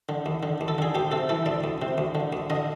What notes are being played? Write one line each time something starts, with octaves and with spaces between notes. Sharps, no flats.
D3
D#2
D3
D#2
A4
D3 G#4
D2 G4
C3 A4
E3 A4
D2 D5
D2
C3
D2
D3
D2
D3 D#5